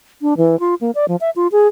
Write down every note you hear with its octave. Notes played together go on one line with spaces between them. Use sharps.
D4
E3
F4
A#3
D5
F3
E5
F4
G#4